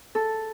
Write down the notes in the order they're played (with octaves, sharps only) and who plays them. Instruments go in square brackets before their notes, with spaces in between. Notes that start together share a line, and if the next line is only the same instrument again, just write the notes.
[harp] A4